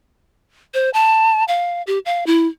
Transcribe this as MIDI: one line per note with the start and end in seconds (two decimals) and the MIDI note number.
0.74 0.90 72
0.94 1.44 81
1.48 1.82 77
1.87 1.99 67
2.06 2.24 77
2.27 2.47 64